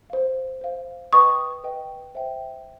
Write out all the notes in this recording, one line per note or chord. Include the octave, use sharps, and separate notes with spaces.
C5 F5
C5 F5
B4 D#5 G5 C#6 D#6
B4 D#5 G5
C5 E5 G5